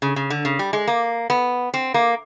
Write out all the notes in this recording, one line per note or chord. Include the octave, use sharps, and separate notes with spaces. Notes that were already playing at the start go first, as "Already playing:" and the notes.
C#3
C#3
D3
C#3
G3
G#3
A#3
B3
C4
A#3